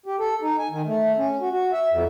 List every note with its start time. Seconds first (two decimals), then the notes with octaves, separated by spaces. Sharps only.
0.06 G4
0.20 A4
0.42 D#4
0.59 G#5
0.71 D#3
0.86 A3
1.18 C#4
1.41 F#4
1.52 F#4
1.73 E5
1.91 F2